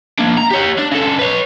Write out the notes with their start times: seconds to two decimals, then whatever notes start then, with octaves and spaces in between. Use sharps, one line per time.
0.19 A#3 D4
0.38 A#5
0.51 G4 C#5
0.79 D4
0.92 C#3 A4
1.19 B4 C#5